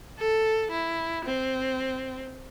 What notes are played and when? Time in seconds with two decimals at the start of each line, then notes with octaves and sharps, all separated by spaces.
0.19 A4
0.71 E4
1.25 C4